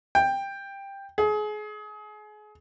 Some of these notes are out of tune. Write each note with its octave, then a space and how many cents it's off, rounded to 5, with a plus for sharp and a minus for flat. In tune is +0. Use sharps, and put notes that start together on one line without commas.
G5 +10
G#4 +30